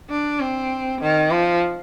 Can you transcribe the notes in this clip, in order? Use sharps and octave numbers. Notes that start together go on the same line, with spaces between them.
D4
C4
D#3
F3